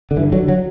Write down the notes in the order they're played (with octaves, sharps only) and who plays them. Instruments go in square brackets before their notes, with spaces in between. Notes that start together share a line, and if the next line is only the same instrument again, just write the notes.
[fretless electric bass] D3
G2 E3
D3 F#3
F#3